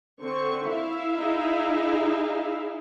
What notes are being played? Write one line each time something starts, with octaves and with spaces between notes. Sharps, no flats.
D3 C4 C#6
E4 E5 F5
D#4 G#4